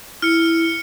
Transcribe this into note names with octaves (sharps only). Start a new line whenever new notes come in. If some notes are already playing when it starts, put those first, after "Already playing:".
E4 F6 C#7